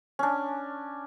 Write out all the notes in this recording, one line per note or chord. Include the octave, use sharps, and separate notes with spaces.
C#4 D4